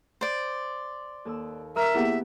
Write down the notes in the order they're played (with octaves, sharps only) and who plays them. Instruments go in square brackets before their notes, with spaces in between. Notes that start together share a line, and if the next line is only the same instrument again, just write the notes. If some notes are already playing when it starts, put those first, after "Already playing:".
[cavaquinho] C5 D5
[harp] D#2 A4 E6
[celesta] A#4 A#5 F6 [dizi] E5
[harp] A#3 B3 G4 [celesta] E4 G#4 F#5